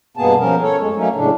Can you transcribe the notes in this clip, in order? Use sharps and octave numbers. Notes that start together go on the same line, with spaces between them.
G2 B2 A#3 B3 G#4 A5
F3 C#4 A#4
A4 C#5
F#2 A2 G#3
F#3 A3 A#3 C#4 D#4
A2 C#3 D4